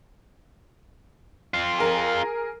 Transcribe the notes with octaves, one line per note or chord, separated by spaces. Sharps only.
C4 F4
G#4 A#4